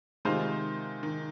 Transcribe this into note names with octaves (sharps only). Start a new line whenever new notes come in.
C3 D#3 G#3 F4 C5 F5
D#3